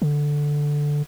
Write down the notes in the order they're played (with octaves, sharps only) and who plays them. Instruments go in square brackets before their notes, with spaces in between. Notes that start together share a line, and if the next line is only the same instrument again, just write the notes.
[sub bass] D3